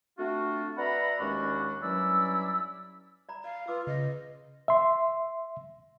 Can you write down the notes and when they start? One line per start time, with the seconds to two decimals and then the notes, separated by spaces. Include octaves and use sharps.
0.18 A3 C4 D4 F4 F#4
0.78 B4 D5 E5 F#5 A#5 B5
1.19 D#2 G#3 C#4 D4 F#4 B5
1.82 G2 F#3 C#4 E4 D5 E6
3.29 D5 A#5 B5
3.44 D5 F5
3.67 F4 B4 D6 E6
3.87 C#3 D#5
4.68 E5 C6